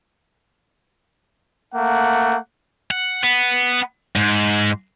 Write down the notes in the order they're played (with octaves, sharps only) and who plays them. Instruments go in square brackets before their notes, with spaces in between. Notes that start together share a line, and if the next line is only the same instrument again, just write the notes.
[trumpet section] A3 A#3 F#5
[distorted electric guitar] F#5
B3
G#2